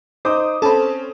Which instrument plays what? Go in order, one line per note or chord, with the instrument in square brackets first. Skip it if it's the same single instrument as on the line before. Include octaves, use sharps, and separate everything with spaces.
[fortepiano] D#4 C5 [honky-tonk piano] D6 D#6
[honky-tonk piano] C4 C#4 [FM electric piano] A4 [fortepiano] A5 B5